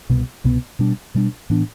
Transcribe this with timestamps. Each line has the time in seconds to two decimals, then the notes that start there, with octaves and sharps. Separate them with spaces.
0.10 C2 B2 B3
0.44 C2 B2 B3
0.79 B2 G3 D4
1.15 B2 G3 D4
1.50 A2 E3 B3 D4